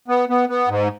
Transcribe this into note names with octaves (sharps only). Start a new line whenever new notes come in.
B3
B3
B3
G#2